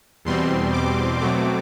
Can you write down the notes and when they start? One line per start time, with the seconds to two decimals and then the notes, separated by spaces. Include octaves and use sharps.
0.25 E2 B2 G3 C4 C6
0.72 D6
1.20 B2 F#3 A3 C4 D6